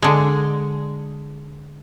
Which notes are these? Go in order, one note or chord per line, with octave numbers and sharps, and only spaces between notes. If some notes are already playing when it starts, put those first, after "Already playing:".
D3 G#3